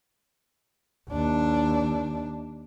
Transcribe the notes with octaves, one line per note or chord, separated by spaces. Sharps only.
D#2 D4